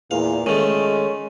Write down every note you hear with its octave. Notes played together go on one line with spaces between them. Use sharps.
E2 A#2 F5
D#3 G#3 A3 C#4